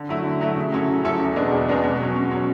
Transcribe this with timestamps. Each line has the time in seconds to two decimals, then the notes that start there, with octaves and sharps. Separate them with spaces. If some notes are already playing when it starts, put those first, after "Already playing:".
Already playing: D3
0.09 F#3 A3 E4
0.24 D3
0.41 F#3 A3 E4
0.56 C#3
0.72 F#3 C#4 E4 A4
0.88 C#3
1.04 F#3 C#4 E4 A4
1.19 E2
1.36 B2 G#3 B3 D4
1.51 E2
1.68 B2 G#3 B3 D4
1.83 B2
2.00 F#3 C#4
2.16 B2
2.31 F#3 C#4